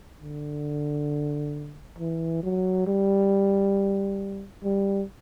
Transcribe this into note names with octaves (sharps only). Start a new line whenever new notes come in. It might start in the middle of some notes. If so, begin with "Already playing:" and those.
D3
E3
F#3
G3
G3